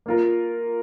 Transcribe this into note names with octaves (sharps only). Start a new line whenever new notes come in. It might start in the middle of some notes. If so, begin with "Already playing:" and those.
A#3 F4 A#4